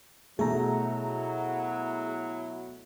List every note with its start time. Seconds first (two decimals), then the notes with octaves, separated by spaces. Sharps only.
0.39 B2 F#3 A3 E4 G#4 A#5